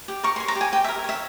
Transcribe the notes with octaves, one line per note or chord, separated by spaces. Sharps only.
G4
A#4 C#6
C6
C#5
A#5
G4
G#5
G4 G5
E5
A#4
C#5 E5